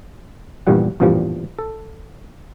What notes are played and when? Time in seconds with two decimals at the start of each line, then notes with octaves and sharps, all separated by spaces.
0.67 A#1 E2 G2 A#2 G3 F#5
1.00 A1 E2 G2 A#2 F3 G3
1.59 A4